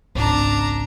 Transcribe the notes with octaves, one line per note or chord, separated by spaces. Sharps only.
G#1 C#2 D4 A#5